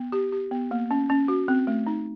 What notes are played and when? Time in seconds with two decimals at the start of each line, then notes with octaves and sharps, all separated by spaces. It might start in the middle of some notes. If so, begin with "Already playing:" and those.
Already playing: B3
0.12 G4
0.32 G4
0.51 B3
0.71 A#3
0.91 C#4
1.10 C#4
1.28 F#4
1.48 C4
1.67 A3
1.86 D#4